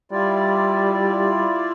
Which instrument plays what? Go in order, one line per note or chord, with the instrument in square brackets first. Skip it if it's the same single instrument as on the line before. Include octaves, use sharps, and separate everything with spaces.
[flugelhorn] G3 [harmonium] E4 F4 D5